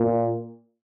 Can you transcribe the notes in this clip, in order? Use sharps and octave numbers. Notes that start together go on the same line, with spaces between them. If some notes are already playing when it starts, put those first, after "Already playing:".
Already playing: A#2